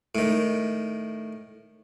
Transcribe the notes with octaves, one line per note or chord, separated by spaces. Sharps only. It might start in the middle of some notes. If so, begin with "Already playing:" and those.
A2 D#3